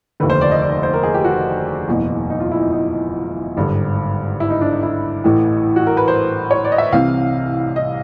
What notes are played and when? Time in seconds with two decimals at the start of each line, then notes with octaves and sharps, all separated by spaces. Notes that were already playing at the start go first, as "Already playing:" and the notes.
0.20 F1 D#2 D3 B4
0.30 C5
0.41 D5
0.51 D#5
0.62 D5
0.83 C5
0.94 A#4
1.03 G#4
1.14 G4
1.24 F#4
1.88 F#1 E2 B2
2.30 D#4
2.40 F4
2.52 E4
2.61 D#4
2.72 D#4
3.57 G#1 G2 D3
4.40 E4
4.50 D#4
4.61 D4
4.72 D#4
4.83 E4
5.24 A1 A2 E3
5.76 F#4
5.87 A#4
5.97 B4
6.08 C5
6.51 C#5
6.64 D5
6.72 D#5
6.78 E5
6.92 C2 C3 E3 F5
7.76 D#5